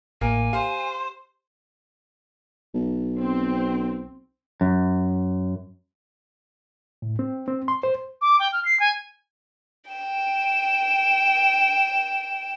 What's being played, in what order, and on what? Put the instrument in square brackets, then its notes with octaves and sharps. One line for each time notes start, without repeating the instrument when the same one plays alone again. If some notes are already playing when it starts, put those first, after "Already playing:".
[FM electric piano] A1 A2 [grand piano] A#3 A#4 [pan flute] G#5
[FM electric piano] G4 [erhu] C5 [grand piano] F5
[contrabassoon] B1
[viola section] C4
[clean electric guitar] F#2
[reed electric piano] A2
C4
C4
C6
C5
[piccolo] D6
G5
F6
C7
G#5
[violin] G5 E7